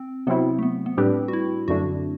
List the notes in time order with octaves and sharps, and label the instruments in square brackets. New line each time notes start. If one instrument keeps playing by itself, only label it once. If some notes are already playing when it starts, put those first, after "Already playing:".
Already playing: [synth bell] C4
[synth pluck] C3 F#3 C4 E4 [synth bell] B3
[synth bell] A3
B3
B3
[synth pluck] A2 G3 D4 G4 B4 [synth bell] C4
[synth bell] F#4
E4
[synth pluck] F#2 D3 A3 D4 [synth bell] F#4